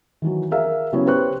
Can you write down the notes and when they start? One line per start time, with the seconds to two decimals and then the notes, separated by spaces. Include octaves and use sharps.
0.22 D#3 E3 F#3
0.51 G#4 A#4 E5 F5
0.93 C#3 F#3 B3 E4 C#5
1.07 G4 B4 C5 C#6 F#6